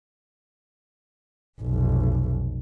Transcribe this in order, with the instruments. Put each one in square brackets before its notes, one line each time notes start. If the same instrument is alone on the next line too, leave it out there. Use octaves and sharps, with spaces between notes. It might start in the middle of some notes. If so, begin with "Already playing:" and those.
[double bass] F1 B1